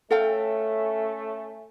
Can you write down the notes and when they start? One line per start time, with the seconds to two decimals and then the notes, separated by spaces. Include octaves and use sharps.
0.11 A3 C#4 A4 F5 G5